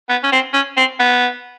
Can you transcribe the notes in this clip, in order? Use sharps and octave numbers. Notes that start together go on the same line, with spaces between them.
B3
C#4
C4
C#4
C4
B3